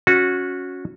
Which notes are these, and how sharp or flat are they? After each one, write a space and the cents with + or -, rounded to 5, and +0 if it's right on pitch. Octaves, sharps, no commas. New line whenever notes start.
C#4 +0 F#4 -20